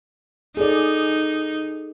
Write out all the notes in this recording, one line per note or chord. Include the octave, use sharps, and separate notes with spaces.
D#4 G#4 A4 D5